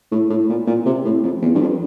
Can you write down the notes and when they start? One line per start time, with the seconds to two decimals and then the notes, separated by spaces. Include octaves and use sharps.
0.12 A2
0.30 A2
0.49 A#2
0.67 A#2
0.86 C3
1.05 A2
1.23 F2
1.42 E2
1.55 G2
1.61 F2